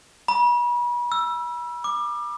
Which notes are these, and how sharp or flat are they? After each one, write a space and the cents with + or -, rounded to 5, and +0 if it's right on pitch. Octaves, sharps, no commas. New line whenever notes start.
B5 -35
E6 +15
D6 +25